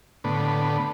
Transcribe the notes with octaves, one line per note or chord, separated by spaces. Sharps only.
A2 D3 B3